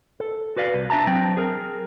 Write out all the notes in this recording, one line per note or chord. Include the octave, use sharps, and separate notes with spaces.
A4
F#4 B4 D5 F5
C2
D4 E5 A5 A#5
F#3 C4 G5
G#4 A#4